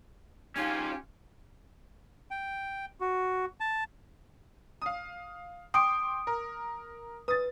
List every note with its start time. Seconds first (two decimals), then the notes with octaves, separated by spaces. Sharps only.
0.56 C#4 D#4 F4 G4 G#5
2.31 G5
3.01 F#4
3.60 A5
4.82 F5 D#6
5.74 G5 C6 D6 D#6 D7
6.27 A#4
7.28 B4 D#6 A6